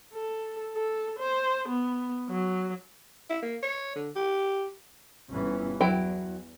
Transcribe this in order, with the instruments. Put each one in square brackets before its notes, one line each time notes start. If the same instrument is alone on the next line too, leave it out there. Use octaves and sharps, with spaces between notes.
[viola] A4
A4
C5
B3
F#3
[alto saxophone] E4
A#3
C#5
D3
G4
[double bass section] G1 E3 C#4
[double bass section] E2 [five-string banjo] F#3 E4 G5